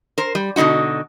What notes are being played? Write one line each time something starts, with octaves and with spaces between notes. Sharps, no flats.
A#4 C5
G3
B2 D3 C4 D#4 F#4